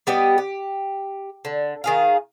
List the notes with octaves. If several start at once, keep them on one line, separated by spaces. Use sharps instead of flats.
G3 B3 G4 D#5
G4
D3
D#3 G#4 F5